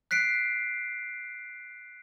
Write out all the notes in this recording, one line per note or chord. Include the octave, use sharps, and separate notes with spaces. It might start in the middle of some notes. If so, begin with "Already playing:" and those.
F#6 B6 C7 D7